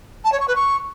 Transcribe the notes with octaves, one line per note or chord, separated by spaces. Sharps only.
A5
C#5
C#6
B4
C#6